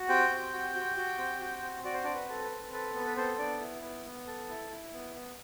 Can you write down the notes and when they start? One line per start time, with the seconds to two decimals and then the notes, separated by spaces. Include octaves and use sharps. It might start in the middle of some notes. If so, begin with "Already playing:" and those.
Already playing: F#4
0.09 C4 G4 G5
0.31 C4
0.52 F#4
0.75 F#4
0.97 F#4
1.18 C4
1.40 F#4
1.62 C4
1.84 F#4 D5
1.94 C5
2.04 C4 D4 D5
2.14 B4
2.29 A4
2.44 B4
2.51 C4
2.73 A4 B4
2.94 B3 B4
3.07 B4
3.16 C4 A4 C5
3.38 B3 D4 D5
3.60 E4
3.82 B3
4.05 B3
4.27 A4
4.49 E4
4.70 E4
4.93 B3
5.15 B3